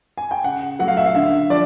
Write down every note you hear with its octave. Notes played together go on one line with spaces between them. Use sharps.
G#5
G5
C#3 F#5
F#3 A3 F#5
F5
E5
F5
D3 E5
F3 D5